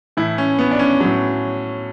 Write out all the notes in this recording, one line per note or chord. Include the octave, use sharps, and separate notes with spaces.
A2 E3 E4
C#4
B3
D4
C#4
A2 F#3